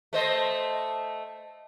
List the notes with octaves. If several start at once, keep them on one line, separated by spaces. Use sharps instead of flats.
A3 C5 D#5